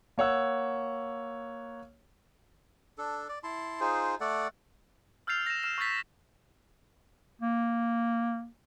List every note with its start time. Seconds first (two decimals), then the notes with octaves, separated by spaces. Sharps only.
0.18 A#3 C#5 F#5 E6
2.98 D4 A4
3.29 D5
3.43 E4 A5 C6
3.80 D#4 F4 G#4 C5
4.21 A3 A4 D5 F#5
5.27 E6 F6 G6 A6 C7 F7
5.46 A#6 E7
5.63 F6 E7
5.78 C#6 E6 G6 A6 B6
7.42 A#3